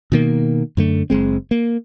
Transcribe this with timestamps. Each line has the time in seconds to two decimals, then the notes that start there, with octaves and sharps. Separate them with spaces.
0.12 B2 D#3 A#3
0.77 F#2 D3 A3
1.10 F#1 G#3 C4
1.51 A#3